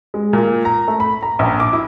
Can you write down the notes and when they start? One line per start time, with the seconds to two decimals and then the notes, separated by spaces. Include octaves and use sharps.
0.14 G#3
0.33 A#2
0.65 A#5
0.88 A3
1.00 B5
1.23 A#5
1.39 A#1
1.60 D6
1.73 E4